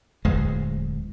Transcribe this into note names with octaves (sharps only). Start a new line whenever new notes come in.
D1 E2 G#3